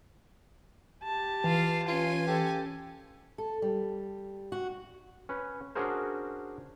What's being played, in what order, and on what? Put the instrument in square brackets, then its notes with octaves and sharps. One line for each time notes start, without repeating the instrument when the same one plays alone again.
[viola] G4 A5
[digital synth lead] E3 [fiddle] F4 F5
[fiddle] C#4 G#5 [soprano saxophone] F4
[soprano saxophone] G4 [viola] A4
[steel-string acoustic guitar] A4
G3
F#4
[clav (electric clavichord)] C#4 B4
C#4 D4 F#4 G#4 A#4 C5